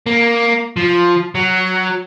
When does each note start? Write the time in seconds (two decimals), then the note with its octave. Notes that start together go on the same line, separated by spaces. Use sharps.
0.06 A#3
0.77 F3
1.35 F#3